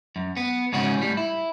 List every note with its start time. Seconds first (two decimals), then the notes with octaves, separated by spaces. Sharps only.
0.16 F#2
0.37 B3
0.73 G#2 C#3 C#4 F#4
0.98 A2 G3
1.17 E4